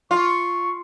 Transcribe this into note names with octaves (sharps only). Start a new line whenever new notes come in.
F4 C#6